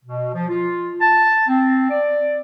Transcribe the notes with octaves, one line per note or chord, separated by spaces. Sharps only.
B2
F3
F4
A5
C4
D5